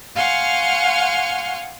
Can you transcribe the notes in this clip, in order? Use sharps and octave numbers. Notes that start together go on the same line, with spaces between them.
F5 F#5 G#5 C6 C#6 F6